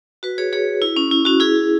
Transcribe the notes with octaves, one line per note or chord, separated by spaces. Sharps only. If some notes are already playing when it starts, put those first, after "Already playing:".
F#4 B4
G#4 C#5
G#4 C#5
E4
C#4
E4
C#4 F#4
E4 G#4